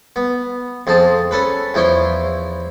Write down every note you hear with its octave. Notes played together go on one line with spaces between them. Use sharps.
B3
F2 F3 G#4 A5
C#4 A4 B4
E2 F3 E4 C#5 C6